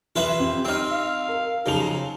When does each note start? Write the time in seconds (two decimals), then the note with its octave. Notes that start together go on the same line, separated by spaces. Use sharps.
0.16 E3 F4 B4 E5 E7 F#7
0.40 F2 G4
0.65 C4 D#4 E6 F6
0.91 F5
1.28 A#4
1.66 C#3 F3 F#3 D#4 F7